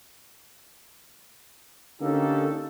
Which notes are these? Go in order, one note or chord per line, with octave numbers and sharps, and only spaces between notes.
D3 A#3 C#4 D#4 G4 A4